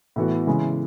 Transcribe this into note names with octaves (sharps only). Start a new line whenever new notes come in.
A2 E3 B3 F#4
C#3 E3 G#3